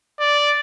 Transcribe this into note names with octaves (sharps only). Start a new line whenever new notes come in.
D5